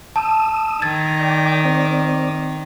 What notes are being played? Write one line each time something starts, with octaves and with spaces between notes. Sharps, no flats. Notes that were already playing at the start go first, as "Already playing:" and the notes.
A5 D#6 E6
D#3 G#6 A6
D5 G5
C4 D5